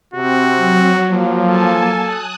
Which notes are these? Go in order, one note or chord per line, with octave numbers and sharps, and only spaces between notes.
C3 C4 F#4
F#3
F3 A#3
A4 G#5 A5
D#6 F#6